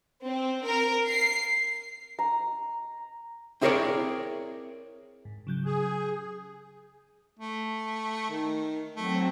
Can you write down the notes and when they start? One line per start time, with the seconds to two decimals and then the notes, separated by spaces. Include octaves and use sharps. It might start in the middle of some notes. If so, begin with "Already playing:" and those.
0.24 C4
0.65 A#4
1.09 C7
2.19 A#5
3.61 C4 E4 G#4 A#4 C#5 D5
5.25 G#2
5.47 C#3 F#3 G6
5.65 G#4
7.40 A3
8.30 D#3
8.96 F#3 A3 C4